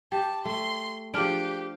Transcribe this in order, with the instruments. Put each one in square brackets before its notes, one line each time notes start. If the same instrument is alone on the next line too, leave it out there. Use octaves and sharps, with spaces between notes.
[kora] G4 [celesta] G5 [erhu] A5
[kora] A3 [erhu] C6
[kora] F3 D4 [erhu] G4 [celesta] G#4 F6 D7